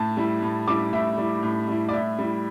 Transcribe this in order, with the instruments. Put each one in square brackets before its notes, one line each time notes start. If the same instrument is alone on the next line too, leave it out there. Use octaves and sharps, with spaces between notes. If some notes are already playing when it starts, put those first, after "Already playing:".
Already playing: [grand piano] A2 A5
G3 E4
A2
G3 E4 D6
A2 E5
G3 E4
A2
G3 E4
D5
A2 E5
G3 E4